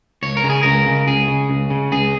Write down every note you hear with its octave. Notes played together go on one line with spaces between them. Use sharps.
C#2 C#5
A#4
C#3
G#4
C#2 A#4
C#3
C#2 G#4
C#3
C#2
C#3
C#2 G#4